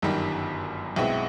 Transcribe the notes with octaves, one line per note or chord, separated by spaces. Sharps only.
G1 F#2 D#3 G3
B1 B2 G#3 C4 E4